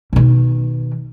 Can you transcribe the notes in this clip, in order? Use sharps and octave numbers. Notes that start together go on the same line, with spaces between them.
B2 D#3